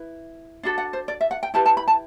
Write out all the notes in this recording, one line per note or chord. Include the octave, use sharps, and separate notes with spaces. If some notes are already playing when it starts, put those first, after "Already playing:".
Already playing: E4 B4
D4 F#4 A4
F#5
C5
D5
E5
F#5
G5
E4 G4 B4 A5
A5
B5
A5